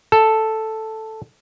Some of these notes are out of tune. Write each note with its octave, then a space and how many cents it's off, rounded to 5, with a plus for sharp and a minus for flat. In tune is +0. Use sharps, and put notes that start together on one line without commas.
A4 +0